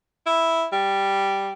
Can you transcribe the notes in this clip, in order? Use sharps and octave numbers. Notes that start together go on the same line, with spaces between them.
E4
G3